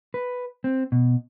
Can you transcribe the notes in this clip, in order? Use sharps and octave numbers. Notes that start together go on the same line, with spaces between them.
B4
C4
B2